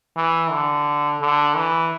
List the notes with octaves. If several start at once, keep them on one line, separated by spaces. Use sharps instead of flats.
E3
D3
D3
E3